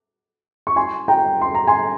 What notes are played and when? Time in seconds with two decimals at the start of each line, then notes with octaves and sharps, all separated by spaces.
0.67 C#6
0.76 G#5 C6
1.08 G5 A#5
1.41 C6
1.55 A#5
1.67 G#5 C6